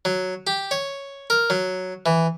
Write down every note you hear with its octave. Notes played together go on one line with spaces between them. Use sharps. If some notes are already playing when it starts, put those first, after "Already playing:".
F#3
G4
C#5
A#4
F#3
E3